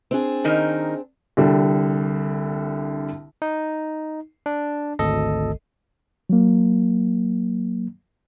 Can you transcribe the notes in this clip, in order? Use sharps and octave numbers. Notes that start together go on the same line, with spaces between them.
C4 D4 G#4
D#3 D#4 A#4
C2 D3 G3
D#4
D4
G#1 D2 A4 D#5
F#3 A#3